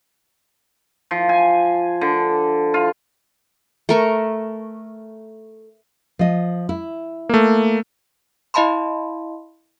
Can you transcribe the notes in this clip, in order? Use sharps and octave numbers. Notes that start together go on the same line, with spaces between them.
F3
G#5
D3
F4
A3 A#4 C#6
F3 D#5
E4
A3 A#3
E4 D#5 F5 A5 B5 C6